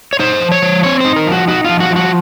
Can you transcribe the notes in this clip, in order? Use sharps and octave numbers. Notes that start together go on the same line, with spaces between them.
C#5
D#4 C5
F3
C#5
F3
C4 C#5
D#4 C5
A#4
F3 F#4
D#4 F#4
F3 F4
F#4
F3
F#4